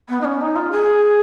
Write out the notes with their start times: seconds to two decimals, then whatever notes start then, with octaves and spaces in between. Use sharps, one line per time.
0.09 B3
0.20 D#4
0.24 C#4
0.41 D#4
0.55 F4
0.71 G#4